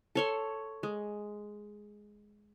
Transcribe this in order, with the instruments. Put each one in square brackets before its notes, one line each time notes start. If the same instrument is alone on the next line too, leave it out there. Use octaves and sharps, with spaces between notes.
[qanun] A4 C#5 C6
G#3